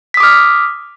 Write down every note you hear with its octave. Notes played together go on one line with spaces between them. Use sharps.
D6 D#6 F6 B6